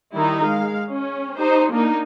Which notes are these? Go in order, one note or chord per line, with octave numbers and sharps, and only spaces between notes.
D#3 G3 D#4 E4
G#3 F5
C#4
D#4 G4 C5
A#3 D4 D#4